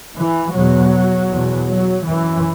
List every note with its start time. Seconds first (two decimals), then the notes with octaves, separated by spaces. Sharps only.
0.17 E3
0.54 E2 B2 F#3
1.30 E2 B2
1.69 F#3
2.07 F#2 E3